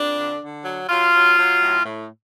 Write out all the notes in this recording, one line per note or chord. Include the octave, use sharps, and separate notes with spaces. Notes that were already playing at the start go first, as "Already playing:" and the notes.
Already playing: F2 D4
D3
D3
F#3
F#3 F4
F#3
F#3
A2
A2